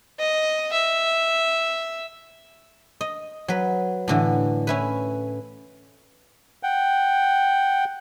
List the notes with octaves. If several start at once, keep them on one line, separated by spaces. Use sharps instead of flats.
D#5
E5
D#5
F#3 B4
A2 D3 E3
C#4 E4 B4
F#5 G5